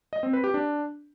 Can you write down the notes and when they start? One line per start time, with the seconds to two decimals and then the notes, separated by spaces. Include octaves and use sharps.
0.13 D#5
0.23 C4
0.33 B4
0.44 G4
0.54 D4